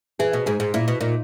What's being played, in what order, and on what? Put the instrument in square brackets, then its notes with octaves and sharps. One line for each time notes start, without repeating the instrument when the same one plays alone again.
[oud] E3 [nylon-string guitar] G#4
[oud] B2
[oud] G#2 [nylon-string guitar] G#4
[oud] G#2
[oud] A#2 [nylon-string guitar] E4
[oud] B2
[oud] A#2 [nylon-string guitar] D#4